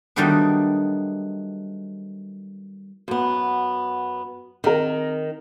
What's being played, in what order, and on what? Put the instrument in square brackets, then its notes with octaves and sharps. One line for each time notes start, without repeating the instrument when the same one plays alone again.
[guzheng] D#3 F#3 G3 A3 B3 D4
[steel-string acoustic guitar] F#2 B3
[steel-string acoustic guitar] D#3 [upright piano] C4 A#4